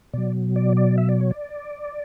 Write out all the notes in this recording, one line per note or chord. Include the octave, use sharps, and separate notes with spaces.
B2 F#3 D5
D5
D5
E5
D5
C#5
D5